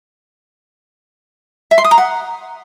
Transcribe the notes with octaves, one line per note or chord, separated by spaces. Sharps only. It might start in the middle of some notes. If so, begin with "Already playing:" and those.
E5
C6
D#6
A#5
F#5